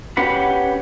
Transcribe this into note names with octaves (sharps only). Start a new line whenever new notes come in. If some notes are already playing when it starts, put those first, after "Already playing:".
C#4 G4 B4 F#5 B5